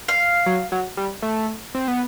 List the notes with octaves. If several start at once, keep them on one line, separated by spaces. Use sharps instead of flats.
F5
F#3
F#3
G3
A3
C4
B3